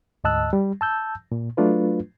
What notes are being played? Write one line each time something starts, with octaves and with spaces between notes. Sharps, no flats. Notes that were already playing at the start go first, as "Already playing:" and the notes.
D2 G#2 D#5 A5 E6 F#6
G3
A5 E6 G6
A#2
F#3 A3 D4 F4 B4